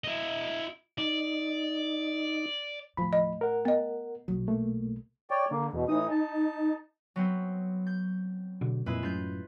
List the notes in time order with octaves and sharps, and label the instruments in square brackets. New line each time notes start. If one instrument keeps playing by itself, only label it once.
[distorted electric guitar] E4 D#5
[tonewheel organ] D#4 [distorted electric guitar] D5
[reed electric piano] D#2 F3 B5 [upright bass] A2
[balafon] D#5
[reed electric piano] A#4 F#5
[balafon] B3 D#5
[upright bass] B1 A#2 [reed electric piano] F#3
[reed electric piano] A3 A#3
[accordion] C#5 D5 G5
[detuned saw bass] D3 [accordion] A#3
[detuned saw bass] E2 [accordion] B2
[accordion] A2 E3 D#6 [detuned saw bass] D#4
[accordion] A5
[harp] F#3 B3 C4
G6
[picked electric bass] B2 D3
[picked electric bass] F2 A#2 [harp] G#3 E4 B4
[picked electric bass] A1 F#2 [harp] F4 G6